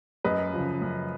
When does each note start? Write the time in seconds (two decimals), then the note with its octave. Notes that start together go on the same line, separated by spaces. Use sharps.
0.25 F#2 B4 D#5
0.53 C#3 F3
0.82 F#2